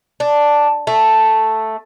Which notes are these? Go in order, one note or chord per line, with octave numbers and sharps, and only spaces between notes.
D4
A3